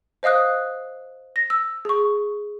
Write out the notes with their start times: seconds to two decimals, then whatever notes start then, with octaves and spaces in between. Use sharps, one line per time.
0.23 C5 D#5 F5 D#6 F#6
1.36 A#6
1.50 E6
1.85 G#4 C#6